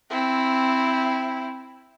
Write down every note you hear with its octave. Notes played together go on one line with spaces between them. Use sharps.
C4 E4